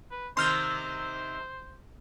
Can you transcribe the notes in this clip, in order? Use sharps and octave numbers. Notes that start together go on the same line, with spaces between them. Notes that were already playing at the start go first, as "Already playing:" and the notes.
B4
C3 D#3 C5 C6 F6 G6